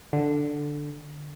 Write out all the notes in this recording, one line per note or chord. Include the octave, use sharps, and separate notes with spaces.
D3